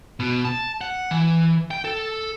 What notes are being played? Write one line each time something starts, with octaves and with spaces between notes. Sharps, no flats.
B2
A5
F#5
E3
G5
A4